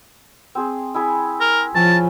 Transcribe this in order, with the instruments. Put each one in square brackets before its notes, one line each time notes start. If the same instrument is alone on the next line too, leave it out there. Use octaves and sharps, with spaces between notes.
[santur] C4 G#4
E4 G#4
[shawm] A#4
[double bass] F3 [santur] C#4 [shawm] A5